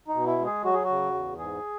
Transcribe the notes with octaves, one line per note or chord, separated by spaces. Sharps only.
D#4
B2
E4
G#3
G#4
F#3 F#4
G#4
F#4
C#3
E2
G#2 G#4